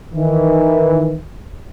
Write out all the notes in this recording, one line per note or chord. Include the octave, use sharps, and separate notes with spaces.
D#3 E3